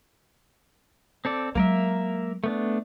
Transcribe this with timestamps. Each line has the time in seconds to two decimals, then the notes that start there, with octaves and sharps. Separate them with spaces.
1.25 C4 A4 D5
1.55 F#3 G#3 A#3 A#4 E5
2.44 A3 B3 D4